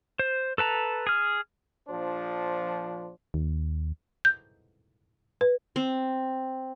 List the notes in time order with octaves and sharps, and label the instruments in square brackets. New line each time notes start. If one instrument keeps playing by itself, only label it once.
[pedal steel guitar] C5
A4 B4 A5 A#5
G#4 F6
[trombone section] A#1 F3 D4 C5
[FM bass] D#2
[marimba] G6
[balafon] B4
[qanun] C4